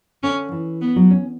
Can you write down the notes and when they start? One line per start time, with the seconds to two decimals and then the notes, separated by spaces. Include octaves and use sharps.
0.23 D3 C#4
0.52 E3
0.81 B3
0.96 F#3
1.10 C#4